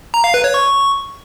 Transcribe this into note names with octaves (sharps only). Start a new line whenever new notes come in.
A#5
F5
B4
C#5
C#6